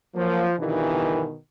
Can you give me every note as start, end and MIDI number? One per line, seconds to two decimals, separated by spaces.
0.15 0.53 53
0.15 0.46 54
0.15 0.46 58
0.59 1.22 31
0.59 1.22 43
0.59 1.35 47
0.59 1.35 51
0.59 1.22 52